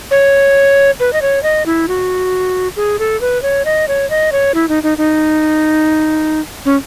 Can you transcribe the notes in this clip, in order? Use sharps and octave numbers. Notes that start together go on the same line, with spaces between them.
C#5
B4
D#5
C#5
D#5
E4
F#4
G#4
A4
B4
C#5
D#5
C#5
D#5
C#5
E4
D#4
D#4
D#4
C#4